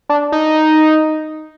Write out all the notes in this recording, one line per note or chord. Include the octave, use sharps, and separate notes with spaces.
D4
D#4